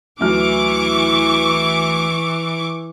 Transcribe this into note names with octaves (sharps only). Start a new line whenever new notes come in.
D2 E3 F#3 C#6 D6 F6